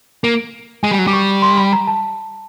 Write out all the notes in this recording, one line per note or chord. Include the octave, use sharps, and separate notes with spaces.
A#3
G#3 G#5
G3
F#3
G3 D6
C#6
C6
B5
A#5
A5